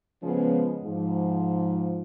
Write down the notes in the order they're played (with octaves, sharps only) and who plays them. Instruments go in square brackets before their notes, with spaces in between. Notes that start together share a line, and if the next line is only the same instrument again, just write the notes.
[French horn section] C#3 F3 G#3 B3 C#4 G#4
G#2 F3